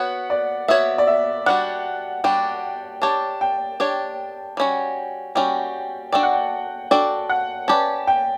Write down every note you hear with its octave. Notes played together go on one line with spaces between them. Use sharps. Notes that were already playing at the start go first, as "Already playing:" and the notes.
Already playing: B3 F#4 C#5 F#5
D5
B3 F#4 C#5 E5
D5
E5
G3 D4 F#4 F#5
G3 D4 F#4 G5
D4 G4 C#5 A5
G5
D4 G4 C#5
G3 C#4 F#4
G3 C#4 F#4 G5
D4 F#4 A4 D5 G5
F#5
G5
D4 F#4 A4 D5 G5
F#5
C#4 G4 B4 D5 A5
G5